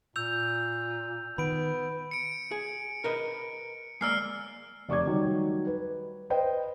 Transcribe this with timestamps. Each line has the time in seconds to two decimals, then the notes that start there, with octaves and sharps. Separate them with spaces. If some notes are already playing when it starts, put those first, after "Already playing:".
0.16 A#2 E6 G6 F7
1.38 D#3 B3 B5 D7
2.11 C#7 D7
2.51 G#4
3.04 A#4 B4 D#5
4.01 G#3 A#3 D5 E6 F6 C7
4.89 F1 D5 C#6 D6 G#6
5.06 D#3 F#3 G3
5.67 B4
6.30 B4 C5 D#5 G5